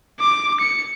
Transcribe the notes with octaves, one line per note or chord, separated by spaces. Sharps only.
D6
C#7